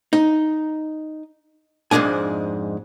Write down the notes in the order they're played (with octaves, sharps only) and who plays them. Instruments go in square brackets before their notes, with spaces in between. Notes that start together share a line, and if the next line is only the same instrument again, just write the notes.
[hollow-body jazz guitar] D#4
F2 G#2 E3 G#3 D4 G#5